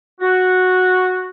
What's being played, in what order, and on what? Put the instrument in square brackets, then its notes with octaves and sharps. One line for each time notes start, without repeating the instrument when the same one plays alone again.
[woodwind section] F#4